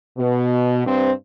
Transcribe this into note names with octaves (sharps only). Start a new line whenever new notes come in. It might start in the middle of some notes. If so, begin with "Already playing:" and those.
B2
G2 C4 C5